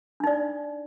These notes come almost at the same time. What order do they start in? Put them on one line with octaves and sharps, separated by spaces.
D4 D#4 D5